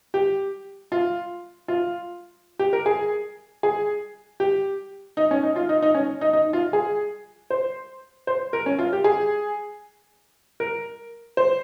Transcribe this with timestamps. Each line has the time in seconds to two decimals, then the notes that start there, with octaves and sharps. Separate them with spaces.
0.14 G4
0.92 F4
1.68 F4
2.59 G4
2.73 A#4
2.86 G#4
3.63 G#4
4.40 G4
5.17 D#4
5.31 C#4
5.43 D#4
5.56 F4
5.69 D#4
5.82 D#4
5.95 C#4
6.21 D#4
6.33 D#4
6.53 F4
6.73 G#4
7.50 C5
8.27 C5
8.53 A#4
8.66 C#4
8.79 F4
8.93 G4
9.04 G#4
10.60 A#4
11.37 C5